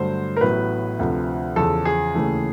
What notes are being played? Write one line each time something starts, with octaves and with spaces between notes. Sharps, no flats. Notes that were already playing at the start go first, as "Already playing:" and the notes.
Already playing: G2 D3 F#3 A3 C5
A#4
A1 A2 F#3 B3 B4
D2 C3 F3
E2 C#3 F3 A4
G#4
D#2 C#3 E3 A3